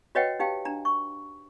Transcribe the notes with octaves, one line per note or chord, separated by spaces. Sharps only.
F#4 B4 C#5 D#5 F#5 G5
D#4 G4 F5 G5
D4 A#5
C#6